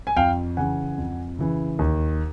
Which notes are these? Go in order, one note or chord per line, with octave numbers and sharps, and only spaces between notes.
G#5
F2 F5 G5
C#3 E3 F#5 G#5
F2
C#3 E3
D#2